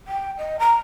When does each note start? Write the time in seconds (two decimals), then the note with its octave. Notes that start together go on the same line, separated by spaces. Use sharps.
0.07 G5
0.38 D#5
0.59 A#5